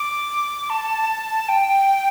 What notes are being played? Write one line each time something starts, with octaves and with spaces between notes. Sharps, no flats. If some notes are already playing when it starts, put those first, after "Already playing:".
Already playing: D6
A5
G5